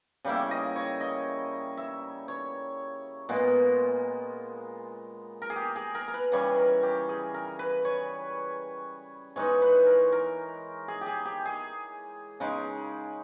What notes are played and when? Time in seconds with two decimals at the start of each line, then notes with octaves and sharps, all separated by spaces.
0.25 C#3 G3 A#3 E4 G5
0.51 D#5
0.76 C#5
1.01 D#5
1.77 E5
2.28 C#5
3.29 A#2 G#3 B3
5.42 A#4
5.50 G#4
5.56 G4
5.76 G#4
5.95 A#4
6.08 A#4
6.14 B4
6.32 C#3 E3 G3 C#5
6.58 A#4
6.83 G4
7.09 G#4
7.34 A#4
7.59 B4
7.85 C#5
9.36 E3 G#3 D#4 C#5
9.62 B4
9.86 A#4
10.12 A#4
10.88 G#4
11.01 G4 G#4
11.26 G4
11.45 G#4
12.40 C#3 G#3 D#4